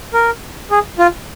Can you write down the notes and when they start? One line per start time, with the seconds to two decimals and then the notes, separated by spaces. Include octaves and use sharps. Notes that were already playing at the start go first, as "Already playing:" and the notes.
0.13 A#4
0.71 G#4
0.99 F4